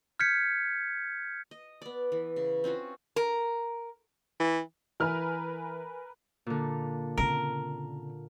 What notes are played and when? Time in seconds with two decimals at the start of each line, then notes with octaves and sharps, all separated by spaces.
0.19 F6 G6 G#6 B6 C#7
1.51 D#5
1.82 B3 D5
2.12 E3
2.36 C#3
2.64 C4 C#4 F4 F#4
3.16 A#4
4.40 E3
5.00 E3 A#4 B4 G#5 F6
6.46 A#2 D3
7.18 C#3 C4 A#4